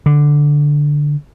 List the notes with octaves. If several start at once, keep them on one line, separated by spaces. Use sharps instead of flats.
D3